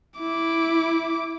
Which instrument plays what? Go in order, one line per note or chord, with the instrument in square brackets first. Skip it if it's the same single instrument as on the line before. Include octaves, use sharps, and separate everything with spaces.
[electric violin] E4 D6